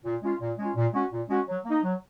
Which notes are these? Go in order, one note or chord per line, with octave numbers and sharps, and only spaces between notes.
A#2
G#3 C#4 F4
A#2
G#3 C#4 F4
A#2
G#3 C#4 F#4
A#2
G#3 C#4 F#4
F#3
A#3 D#4
F#3